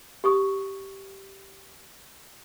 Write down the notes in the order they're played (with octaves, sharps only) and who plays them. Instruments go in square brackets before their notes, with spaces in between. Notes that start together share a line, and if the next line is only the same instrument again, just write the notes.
[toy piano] G4 C#6 D#6